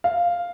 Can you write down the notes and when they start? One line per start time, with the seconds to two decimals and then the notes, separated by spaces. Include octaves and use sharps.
0.04 F5